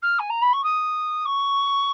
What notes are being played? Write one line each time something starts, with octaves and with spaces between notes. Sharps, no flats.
F6
G#5
A#5
B5
C#6
D#6
C#6